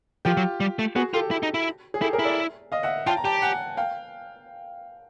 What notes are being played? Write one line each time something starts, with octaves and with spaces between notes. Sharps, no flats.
F3 F4 G4
F#3
G3
A3
B3 F#4 G#4
F4 G4 A4
E4
D#4
E4
G#4
E4 G4 A4
G#4 A#4
E4
D5 E5
D#5 F5
E5 F#5
F4 G5 A5
A#5
G4 G5 A5
F#5 G#5
F5 G5